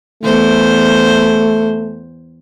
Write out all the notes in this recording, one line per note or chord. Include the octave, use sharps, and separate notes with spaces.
E2 A3 C5